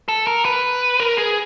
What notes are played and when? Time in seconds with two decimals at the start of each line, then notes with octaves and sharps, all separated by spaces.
0.08 A4
0.27 A#4
0.45 B4
1.00 A#4
1.18 G#4